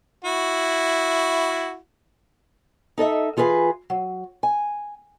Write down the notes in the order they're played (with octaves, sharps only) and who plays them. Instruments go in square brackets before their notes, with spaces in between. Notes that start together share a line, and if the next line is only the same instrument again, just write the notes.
[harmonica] E4 F#4
[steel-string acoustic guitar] D#4 A4 D#5 E5
E3 F4 G#4 B4 G#5
F#3
G#5